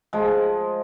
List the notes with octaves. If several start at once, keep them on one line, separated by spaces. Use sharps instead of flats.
F3 G#3